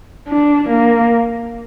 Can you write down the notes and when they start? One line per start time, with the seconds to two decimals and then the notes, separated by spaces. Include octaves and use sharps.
0.29 D4
0.69 A#3